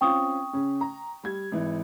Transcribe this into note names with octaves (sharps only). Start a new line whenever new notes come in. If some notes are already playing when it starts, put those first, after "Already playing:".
C4 C#4 F4 G5 C#6 D#6
C#3 C#4
A#5
G3 G#6
G#1 E3